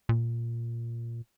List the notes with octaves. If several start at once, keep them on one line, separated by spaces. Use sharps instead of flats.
A#2